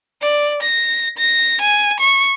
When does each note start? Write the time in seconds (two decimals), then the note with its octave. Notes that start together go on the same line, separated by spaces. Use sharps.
0.22 D5
0.63 A#6
1.18 A#6
1.62 G#5
2.00 C#6